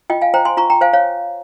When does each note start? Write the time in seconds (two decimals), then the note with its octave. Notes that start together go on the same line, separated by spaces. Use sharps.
0.10 F4 D#5 G5
0.21 F5 G#5
0.34 C5 G5 A#5
0.45 G#5 C6
0.57 F4 A#5 C#6
0.70 G5 A#5
0.81 C5 F5 G#5
0.93 C#5 F5